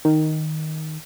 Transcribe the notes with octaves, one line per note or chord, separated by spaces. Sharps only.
D#3